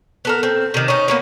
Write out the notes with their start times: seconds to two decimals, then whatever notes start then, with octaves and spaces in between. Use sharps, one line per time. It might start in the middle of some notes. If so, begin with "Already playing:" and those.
0.25 B3 A4 A#4
0.43 C4
0.74 C3 D#3
0.88 C#4 D#4
1.08 A#3 B3 C#4